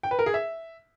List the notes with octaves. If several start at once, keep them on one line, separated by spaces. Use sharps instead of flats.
G5
B4
A#4
G#4
E5